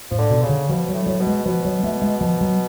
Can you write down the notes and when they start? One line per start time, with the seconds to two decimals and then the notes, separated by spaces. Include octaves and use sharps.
0.10 A2 F3
0.18 D3
0.30 B2
0.43 C#3
0.49 D3
0.69 B2 F3
0.88 F#3
0.94 A2
1.06 F#3
1.20 B2
1.27 G#3
1.45 B2 F3
1.65 F#3
1.83 A3
2.02 G#3
2.21 F3
2.41 F#3